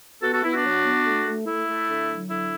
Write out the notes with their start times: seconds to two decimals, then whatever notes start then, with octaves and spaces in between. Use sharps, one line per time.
0.23 B3 F#4 A4
0.33 F#4 A4
0.43 B3 E4
0.54 D4 F#4
0.65 F#3
0.84 B3
1.06 A3
1.27 A3
1.47 A3 E4
1.68 A3
1.88 D3
2.10 F#3
2.30 D3 E4